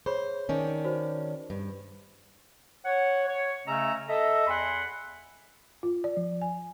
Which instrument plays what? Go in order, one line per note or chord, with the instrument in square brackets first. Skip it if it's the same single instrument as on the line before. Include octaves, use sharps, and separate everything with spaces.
[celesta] G#4 C#5 B5 [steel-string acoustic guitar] C5
[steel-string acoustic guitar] D#3 C#4 D4
[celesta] F#4 C5
[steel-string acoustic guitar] G2
[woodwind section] C#5 F#5
C#5
C#3 A3 C#4 D#5 A#5 E6
A4 D#5 E5
E2 F#5 G#5 B5 C6
[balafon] F4
D5
F3
G#5